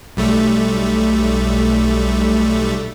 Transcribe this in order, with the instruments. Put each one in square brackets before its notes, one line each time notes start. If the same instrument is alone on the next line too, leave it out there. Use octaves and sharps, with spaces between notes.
[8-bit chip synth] B1 G3 A3